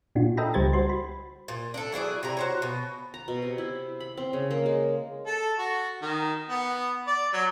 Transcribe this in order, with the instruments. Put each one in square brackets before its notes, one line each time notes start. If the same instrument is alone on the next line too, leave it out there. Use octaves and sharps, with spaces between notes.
[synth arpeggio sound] A#2 D4 F4 F#4
A4 D#5 E5 G5 A#5 B5
C#2 G3 G4 C5 G#6 A6
F#4 C5 C6
B5
[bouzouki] A#2
D4 A4
F#3 E4 G#4 D5
C3 E4 A#5
F#4 C5 C#5
B2
[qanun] A#5
B2
C3
E4
B5
C4
C#3
A#3
G#3
[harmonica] A4
F#4
D#3
B3
D5
F#3